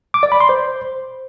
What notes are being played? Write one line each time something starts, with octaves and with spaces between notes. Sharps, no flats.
D6
D5
B5
C6
C5